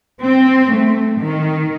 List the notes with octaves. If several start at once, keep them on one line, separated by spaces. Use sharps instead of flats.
C4
A3
D#3